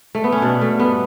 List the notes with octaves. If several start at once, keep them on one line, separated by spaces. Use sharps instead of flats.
A3
B3
C#4
B2 D4
A3
G2 B3